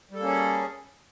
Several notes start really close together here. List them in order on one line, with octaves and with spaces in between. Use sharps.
G3 A4 A#3 C#4 G#4